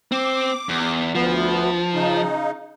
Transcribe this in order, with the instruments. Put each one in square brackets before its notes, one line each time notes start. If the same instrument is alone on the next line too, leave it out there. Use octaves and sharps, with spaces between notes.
[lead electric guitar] C4 [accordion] D6
[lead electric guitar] E2
[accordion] D2 B3 [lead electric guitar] F3
[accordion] C#3 D#4